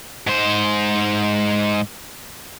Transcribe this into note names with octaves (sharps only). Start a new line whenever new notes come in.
G#2 C5